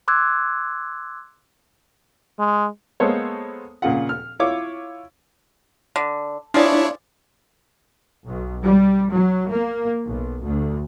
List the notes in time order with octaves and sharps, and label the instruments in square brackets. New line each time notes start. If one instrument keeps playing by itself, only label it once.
[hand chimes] C6 D6 E6 F#6 G#6
[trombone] G#3
[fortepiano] G#3 A#3 B3 A4 C5 C#5
A#2 C#3 F4 F#5
F6
E4 F4 C#5 D6
[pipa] D3
[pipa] F3 G#4 D5 [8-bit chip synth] D4 E4 C#5
[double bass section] B1
G3
F#3
A#3
B1
D2